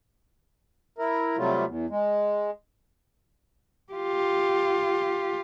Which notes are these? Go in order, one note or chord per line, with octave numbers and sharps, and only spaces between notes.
E4 A#4
C3 F#3 G3 A3 F4
E2
G#3
F4 G4